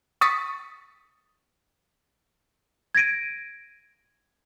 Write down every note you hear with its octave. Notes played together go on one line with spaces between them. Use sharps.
C#6 D#6 A6 B6 C#7
G#6 A#6 D7 D#7